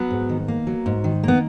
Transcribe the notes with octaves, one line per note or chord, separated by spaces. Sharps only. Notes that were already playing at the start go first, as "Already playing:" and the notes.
Already playing: F#3 B3
G#2
D#3
A#3
F#3
G#2
D#3
A#3 B3